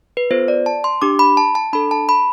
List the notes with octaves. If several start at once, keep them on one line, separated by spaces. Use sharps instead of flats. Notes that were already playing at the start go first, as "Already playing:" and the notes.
B4
B3 F4 A4 C5
D5
A5
C6
D4 G4 D6
B5
A5
A5
D4 A4 B5
A5
B5